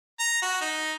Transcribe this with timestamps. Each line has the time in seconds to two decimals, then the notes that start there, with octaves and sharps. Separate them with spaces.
0.19 A#5
0.42 F#4
0.61 D#4